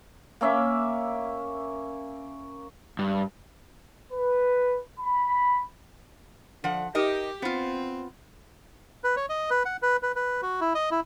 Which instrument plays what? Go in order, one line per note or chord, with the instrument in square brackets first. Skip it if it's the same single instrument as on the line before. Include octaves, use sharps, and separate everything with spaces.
[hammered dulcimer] A#3 C#4 E5
[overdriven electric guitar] G2
[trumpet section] B4
B5
[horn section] D3 [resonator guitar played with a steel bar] F3 F#5
[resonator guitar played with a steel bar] D#4 A#4 D#5 [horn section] G4
[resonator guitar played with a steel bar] B3 F4 [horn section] C4
[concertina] B4
C#5
D#5
B4
F#5
B4
B4
B4
F#4
E4
D#5
E4